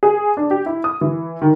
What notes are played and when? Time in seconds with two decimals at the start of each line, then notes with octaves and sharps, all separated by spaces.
0.03 G#4
0.37 D4
0.51 G4
0.66 E4
0.84 D#6
1.01 E3
1.42 D#3